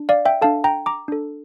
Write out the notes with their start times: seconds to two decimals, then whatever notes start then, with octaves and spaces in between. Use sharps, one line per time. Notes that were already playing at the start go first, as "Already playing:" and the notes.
Already playing: D4
0.09 D5 F5
0.25 E5 G5
0.41 D4 A4 F5 A5
0.64 G5 A#5
0.86 A#5 D6
1.08 D4 A4